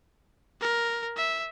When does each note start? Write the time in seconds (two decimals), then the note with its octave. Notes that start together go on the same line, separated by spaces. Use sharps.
0.61 A#4
1.17 E5